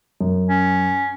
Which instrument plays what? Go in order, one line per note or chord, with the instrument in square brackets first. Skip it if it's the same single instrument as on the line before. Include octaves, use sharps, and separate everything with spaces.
[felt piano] F#2
[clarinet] C#4